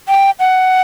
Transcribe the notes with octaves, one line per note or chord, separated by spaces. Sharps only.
G5
F#5